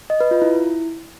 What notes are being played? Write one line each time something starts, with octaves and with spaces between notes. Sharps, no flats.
D#5
B4
F4
E4